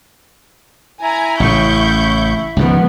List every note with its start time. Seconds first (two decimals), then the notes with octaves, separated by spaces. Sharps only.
1.02 E4 G#5 A#5
1.40 A1 C#3 C#6 G6
2.57 C#2 G#2 D#3 F3 B3